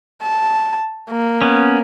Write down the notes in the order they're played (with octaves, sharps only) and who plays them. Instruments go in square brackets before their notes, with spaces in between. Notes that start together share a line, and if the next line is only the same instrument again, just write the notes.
[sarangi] A5
A#3
[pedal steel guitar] B3 C#4